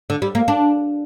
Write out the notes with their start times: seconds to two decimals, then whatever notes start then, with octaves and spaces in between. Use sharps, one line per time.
0.10 D3
0.22 G3
0.35 A#3
0.48 D4